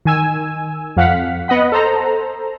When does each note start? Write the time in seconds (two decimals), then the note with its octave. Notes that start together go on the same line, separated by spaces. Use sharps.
0.05 D#3 G#5 E6
0.97 F2 F5 F#5 B6
1.48 B3 D#5 F#5 B5
1.72 A4 C5 A#5